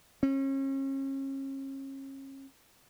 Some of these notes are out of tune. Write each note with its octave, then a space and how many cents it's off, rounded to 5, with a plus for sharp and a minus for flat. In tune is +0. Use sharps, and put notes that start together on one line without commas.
C#4 -35